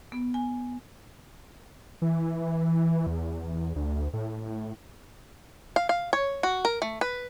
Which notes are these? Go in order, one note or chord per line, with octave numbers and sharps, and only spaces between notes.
B3
G#5
E3
E2
D2
A2
F5
F5
C#5
F#4
A#4
A3
B4